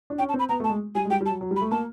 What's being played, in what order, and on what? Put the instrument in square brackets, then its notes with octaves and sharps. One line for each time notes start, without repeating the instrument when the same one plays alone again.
[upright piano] D4
[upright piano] C#4 [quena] G5
[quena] A5
[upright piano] C4
[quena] B5
[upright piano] B3 [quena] A#5
[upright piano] A3
[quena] A5
[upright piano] G#3
[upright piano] G3 [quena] G#5
[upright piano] G#3
[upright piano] G3 [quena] G5
[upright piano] G3
[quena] A5
[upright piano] F#3
F#3
G3
[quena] B5
[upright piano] A3
[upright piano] A#3 [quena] A5